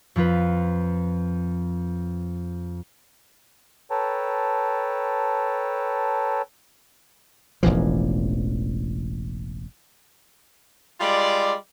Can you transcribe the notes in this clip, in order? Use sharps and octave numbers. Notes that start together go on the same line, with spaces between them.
F2 F3 F4 B4
A4 B4 C#5 G5 A5 A#5
E1 A1 E3 F3
G3 G#3 F4 D5